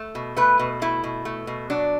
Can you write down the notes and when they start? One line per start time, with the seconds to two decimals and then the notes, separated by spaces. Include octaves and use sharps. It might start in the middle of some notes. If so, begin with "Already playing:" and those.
Already playing: A3
0.15 B2
0.37 A3 B4
0.59 B2
0.81 A3 E4
1.04 B2
1.25 A3
1.47 B2
1.70 F#3 D4